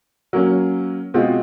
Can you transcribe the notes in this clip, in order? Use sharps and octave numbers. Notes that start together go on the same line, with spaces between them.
F#3 A#3 C#4
B2 G#3 C4 F4